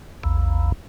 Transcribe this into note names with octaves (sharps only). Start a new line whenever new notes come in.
A#1 E2